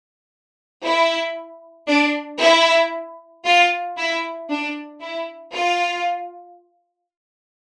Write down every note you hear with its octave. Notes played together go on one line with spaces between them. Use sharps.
E4
D4
E4
F4
E4
D4
E4
F4